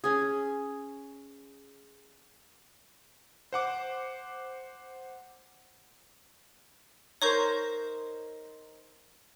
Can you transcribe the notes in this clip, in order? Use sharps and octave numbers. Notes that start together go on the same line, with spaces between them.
C#4 G#4
C5 F#5 D6
D#4 A#4 C5 C#5 C#6 G6